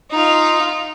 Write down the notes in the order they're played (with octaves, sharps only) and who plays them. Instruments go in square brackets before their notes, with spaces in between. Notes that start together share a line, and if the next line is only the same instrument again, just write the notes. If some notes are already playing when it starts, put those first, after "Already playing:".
[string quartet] D#4 F4